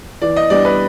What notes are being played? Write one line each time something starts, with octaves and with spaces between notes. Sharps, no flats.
E3 D5
D#5
G3 B3 D4 D5
B4